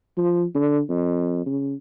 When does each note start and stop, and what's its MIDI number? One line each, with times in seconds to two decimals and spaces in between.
0.17 0.44 53
0.55 0.79 50
0.89 1.42 41
1.46 1.73 49